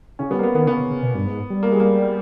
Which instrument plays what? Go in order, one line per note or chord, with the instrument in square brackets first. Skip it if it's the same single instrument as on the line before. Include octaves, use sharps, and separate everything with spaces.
[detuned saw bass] C#3 [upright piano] C#4
[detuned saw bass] G3 [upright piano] B3
[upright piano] A#3
B3
[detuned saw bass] D#3 [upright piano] B3
[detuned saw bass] C#3 [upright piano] B3
[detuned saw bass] C#3
C#3
B2
G2
G#2
G3
[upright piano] A#3
G#3
A#3